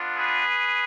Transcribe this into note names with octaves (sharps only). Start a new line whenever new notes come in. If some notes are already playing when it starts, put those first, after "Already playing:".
Already playing: B3 D4 F4
G#4 B4